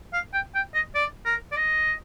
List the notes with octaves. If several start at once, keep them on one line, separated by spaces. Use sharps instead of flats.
F5
G5
G5
D#5
D5
A#4
D5
D#5